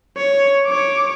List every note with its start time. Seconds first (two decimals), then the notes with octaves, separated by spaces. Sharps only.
0.17 C#5
0.66 C#5 D6